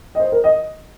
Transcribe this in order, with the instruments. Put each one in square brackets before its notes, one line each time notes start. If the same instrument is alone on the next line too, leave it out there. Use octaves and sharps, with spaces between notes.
[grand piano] D#5
C5
A#4
D#5